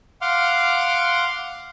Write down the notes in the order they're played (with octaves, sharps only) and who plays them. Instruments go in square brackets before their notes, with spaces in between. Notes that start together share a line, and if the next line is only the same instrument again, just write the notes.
[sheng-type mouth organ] F5 F#5 C6 D6 F6